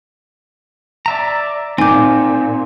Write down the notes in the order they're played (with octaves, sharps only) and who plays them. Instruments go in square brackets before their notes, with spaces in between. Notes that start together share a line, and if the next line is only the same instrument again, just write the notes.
[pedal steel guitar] D5 E5 A#5
[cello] A#2 [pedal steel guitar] C4 G6 [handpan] D#4 [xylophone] G#5 D6